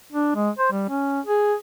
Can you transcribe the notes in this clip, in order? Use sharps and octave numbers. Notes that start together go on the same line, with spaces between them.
D4
G#3
C5
G3
C#4
G#4